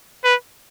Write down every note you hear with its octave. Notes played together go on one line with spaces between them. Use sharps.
B4